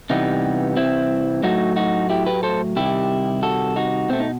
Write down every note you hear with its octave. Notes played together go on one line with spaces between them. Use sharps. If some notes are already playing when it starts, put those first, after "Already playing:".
C3 E3 G3 B3 D#4
C4 E4
A2 F#3 A3 D#4 F#4
D#4 F#4
E4 G4
G4 B4
A4 C5
C3 D#3 G3 E4 G4
F#4 A4
D#4 F#4
B2 A3 C4
D#4